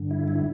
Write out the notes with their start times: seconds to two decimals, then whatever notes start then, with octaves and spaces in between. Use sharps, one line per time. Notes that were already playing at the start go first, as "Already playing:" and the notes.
Already playing: G2 D3
0.11 E4
0.28 E4